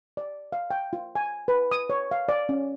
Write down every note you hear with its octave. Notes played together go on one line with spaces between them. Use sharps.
D5
F5
G5
F4
G#5
B4
D#6
C#5
F5
D5
C#4